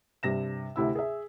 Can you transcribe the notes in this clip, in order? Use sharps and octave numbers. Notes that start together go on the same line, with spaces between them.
G2 C3 A#6 E7
D2 C3 E4 E6
G#4 E5